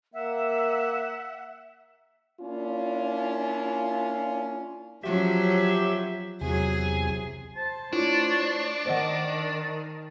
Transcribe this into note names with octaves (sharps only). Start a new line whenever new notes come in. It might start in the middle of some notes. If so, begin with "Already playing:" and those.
A#3 E5 F#5
A#3 C#4 D4 E4 F4
F3 F#3 C#4 G4 E5
E2 C3 F#3 G#4 G#5
C5 A5
A3 D4 E4 F4 C5 C#5
D#3 C5 D#5 F#5 A5